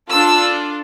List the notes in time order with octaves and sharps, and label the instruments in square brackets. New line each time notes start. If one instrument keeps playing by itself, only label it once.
[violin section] D4 F4 A4 E6